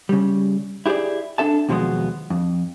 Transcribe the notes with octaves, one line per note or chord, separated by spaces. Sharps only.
C#3 G3
E4 G4 G#4 C5 D5
D4 A4 E5 A5
D#2 B2 F3 F#3 G#3 B3
F2